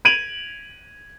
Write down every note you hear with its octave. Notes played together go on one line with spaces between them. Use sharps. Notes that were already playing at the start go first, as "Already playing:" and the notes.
G#6 D7 D#7 F7 F#7